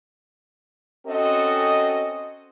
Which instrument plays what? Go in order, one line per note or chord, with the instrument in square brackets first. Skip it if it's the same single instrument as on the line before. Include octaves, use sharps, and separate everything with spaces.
[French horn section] C4 C#4 F#4 A4 D#5